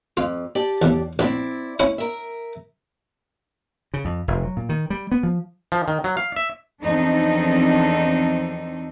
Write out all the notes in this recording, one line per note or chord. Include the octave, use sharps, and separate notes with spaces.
F2 F4
G4 D5 A5
B1 E2
A#1 C4 E4 D5
C#4 E4 F#5
A#4 E5
C#3
F2
F1
F#3
A#2
D#3
G3
B3
F3
F3
D#3
F#3
F5
E5
E2 F3 C4 D4 D#4 A4